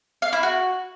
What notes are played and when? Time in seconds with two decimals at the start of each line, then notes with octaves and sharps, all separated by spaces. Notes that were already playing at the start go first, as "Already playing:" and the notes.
0.22 F5
0.33 E4
0.43 F#4